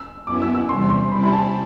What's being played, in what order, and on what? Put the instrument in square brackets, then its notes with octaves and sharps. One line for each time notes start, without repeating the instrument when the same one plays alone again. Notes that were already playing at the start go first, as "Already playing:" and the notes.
Already playing: [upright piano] E6
[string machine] F#2 F#3 B3 E4 [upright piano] D6
[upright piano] E6
E6
[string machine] E2 C3 G3 [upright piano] C6
[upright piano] C6
[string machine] C3 G3 C4 E4 [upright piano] B5
[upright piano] B5
A5